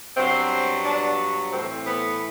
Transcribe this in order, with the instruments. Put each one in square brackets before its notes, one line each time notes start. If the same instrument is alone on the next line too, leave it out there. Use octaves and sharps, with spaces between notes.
[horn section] G2 F#3 B3 C4
D4
A2 E3 A3 C4
B3